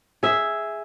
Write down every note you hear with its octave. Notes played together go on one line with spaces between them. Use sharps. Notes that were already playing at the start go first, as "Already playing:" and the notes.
G#4 E5